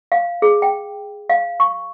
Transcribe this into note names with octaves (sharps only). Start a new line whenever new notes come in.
F5
G#4
G5
F5
C#6